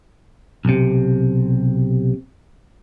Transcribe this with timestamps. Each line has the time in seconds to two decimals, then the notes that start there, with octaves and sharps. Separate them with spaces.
0.65 B1 C3